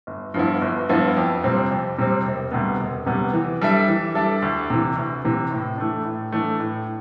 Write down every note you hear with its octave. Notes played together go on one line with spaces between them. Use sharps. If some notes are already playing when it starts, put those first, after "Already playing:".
G1
G2 F3 B3 E4
G1
G2 F3 B3 E4
F2
C3 G3 C4
F2
C3 G3 C4
E1
D2 C3 G3 B3
E1
D2 C3 G3 B3
E3
G3 D4 A4 E5
E3
G3 D4 A4 E5
D2
C3 E3
D2
C3 E3
A2
E3 A3 D4
A2
E3 A3 D4
A2